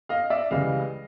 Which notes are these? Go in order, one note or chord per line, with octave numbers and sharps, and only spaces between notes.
D#5 F5
D5 E5
C#2 C#3 E3 G3 D#5 F5